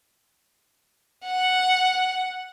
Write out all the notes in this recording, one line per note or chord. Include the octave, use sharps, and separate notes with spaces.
F#5